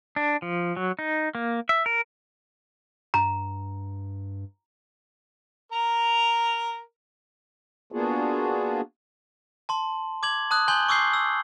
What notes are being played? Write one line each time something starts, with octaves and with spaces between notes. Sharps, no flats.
D4
F3
F#3
D#4
A#3
E5
A#4
G2 A#5
A#4 A#5
A#3 B3 D4 F4 F#4 G#4
A5 C6
D6 G#6 F#7
A5 D#6 F#6
G#5 C6 G6 F#7 G7
C#6 D6 E6 G6 C7 G7
E6